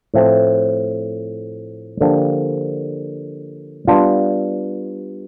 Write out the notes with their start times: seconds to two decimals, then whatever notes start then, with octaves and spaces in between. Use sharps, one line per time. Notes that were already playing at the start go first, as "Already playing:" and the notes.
0.14 A2 F3 A3 C4
2.01 D3 F3 A#3 D4 G4
3.87 G3 B3 D4 F4